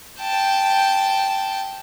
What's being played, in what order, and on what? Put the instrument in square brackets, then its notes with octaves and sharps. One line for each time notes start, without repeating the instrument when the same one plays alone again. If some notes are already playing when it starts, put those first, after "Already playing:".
[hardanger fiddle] G5 A5